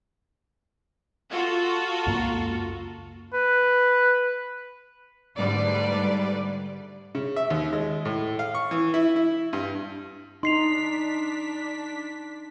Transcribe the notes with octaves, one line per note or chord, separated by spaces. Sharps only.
F4 F#4 A4
C#2 F#2 A#3
B4
G#2 D3 G3 A3 B4 D5
C#3
E5
D#2
G#3
A2
F5
C#6
E3
E4
E4
G2
D4 D#4 C6 B6 C7 F7